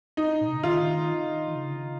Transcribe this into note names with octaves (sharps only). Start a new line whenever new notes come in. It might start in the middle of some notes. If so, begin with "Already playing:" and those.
D#4
A#2
C3
C#3
D#3 F4
D#3
C#3